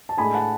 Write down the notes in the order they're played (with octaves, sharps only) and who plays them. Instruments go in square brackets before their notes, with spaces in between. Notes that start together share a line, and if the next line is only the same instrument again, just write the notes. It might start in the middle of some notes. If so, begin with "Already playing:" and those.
[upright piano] A5
A2 G#3 D4 G#5 B5
F#5 A5